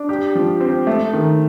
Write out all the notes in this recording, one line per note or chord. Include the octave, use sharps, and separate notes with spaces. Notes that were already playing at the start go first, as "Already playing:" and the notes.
Already playing: D4
G4
F3
C4
A3
D#3